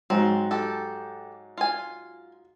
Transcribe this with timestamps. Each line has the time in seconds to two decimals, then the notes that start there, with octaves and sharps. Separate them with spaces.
0.10 G#2 F#3 C4
0.51 G4 A4
1.57 F4 G#5